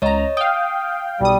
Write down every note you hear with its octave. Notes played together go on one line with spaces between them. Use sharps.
C#2 C#5 D#5 A#5
F5 G5 D#6
B1 G3 D#6